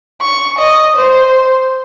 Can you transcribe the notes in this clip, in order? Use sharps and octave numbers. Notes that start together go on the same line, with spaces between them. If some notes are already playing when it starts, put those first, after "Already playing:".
C#6
D#5
C5